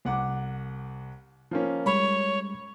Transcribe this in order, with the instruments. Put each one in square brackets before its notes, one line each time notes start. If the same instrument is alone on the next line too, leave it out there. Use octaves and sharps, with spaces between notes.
[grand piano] C2 F#5 D6
F3 A#3 C#4
[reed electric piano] G3 G#3 [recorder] C#5 [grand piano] B5